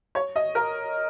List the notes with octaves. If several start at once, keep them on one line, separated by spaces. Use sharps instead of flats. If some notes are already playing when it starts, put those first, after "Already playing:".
C#5
D#5
A#4